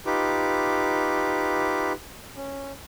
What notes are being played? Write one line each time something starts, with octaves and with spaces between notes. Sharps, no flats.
D#4 F4 G4 B4 D6
C#4